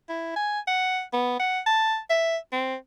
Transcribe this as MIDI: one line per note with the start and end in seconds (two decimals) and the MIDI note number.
0.09 0.33 64
0.36 0.60 80
0.68 1.02 78
1.13 1.38 59
1.40 1.60 78
1.66 1.98 81
2.10 2.37 76
2.53 2.75 60